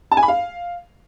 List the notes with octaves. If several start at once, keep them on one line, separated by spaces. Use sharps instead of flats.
A5
G#5
B5
F5